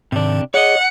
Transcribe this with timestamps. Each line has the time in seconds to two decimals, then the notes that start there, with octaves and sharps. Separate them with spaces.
0.12 G#2 C3 D#3 D4
0.54 G#4 C#5 D#5 F#5